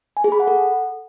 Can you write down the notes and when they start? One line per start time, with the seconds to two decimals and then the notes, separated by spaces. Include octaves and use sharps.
0.17 G#5
0.24 G#4
0.32 B5
0.40 F#5
0.47 A4